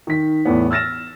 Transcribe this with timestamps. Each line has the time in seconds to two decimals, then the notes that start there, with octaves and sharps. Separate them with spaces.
0.07 D#3 B6
0.45 E2 A2 B3
0.71 E6 F6 A6 A#6 E7